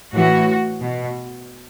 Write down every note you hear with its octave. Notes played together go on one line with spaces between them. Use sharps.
A2 E3 F#4
B2